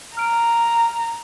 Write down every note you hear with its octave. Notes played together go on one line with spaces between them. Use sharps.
A#5 F6 D7